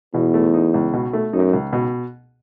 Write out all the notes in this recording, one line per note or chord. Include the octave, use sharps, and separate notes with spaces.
E2 B2
A3
D#4
C#2
B2
A3
F#2 D#4
C#2
B2